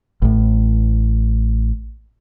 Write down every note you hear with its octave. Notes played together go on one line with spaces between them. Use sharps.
A1 A2